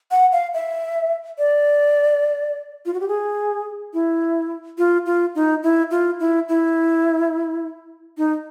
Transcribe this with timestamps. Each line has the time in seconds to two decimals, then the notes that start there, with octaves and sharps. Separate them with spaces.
0.11 F#5
0.32 F5
0.54 E5
1.38 D5
2.86 F4
2.94 F#4
3.00 G4
3.08 G#4
3.93 E4
4.78 F4
5.06 F4
5.35 D#4
5.63 E4
5.91 F4
6.20 E4
6.48 E4
8.18 D#4